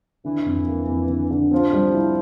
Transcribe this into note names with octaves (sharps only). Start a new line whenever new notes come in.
D3 E3
F2
A#3
F2
D3
D3
F3 C4
G3
E4